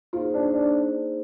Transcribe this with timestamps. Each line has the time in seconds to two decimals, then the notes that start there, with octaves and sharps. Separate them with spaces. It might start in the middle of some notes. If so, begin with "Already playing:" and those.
0.13 A#3 D#4 F4 G#4 C5
0.34 D4
0.54 D4